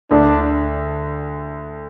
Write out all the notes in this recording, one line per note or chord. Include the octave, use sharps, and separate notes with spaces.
D2 D3 D4